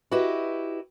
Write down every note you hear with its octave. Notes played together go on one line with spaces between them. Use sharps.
E4 F#4 G4 B4 D#5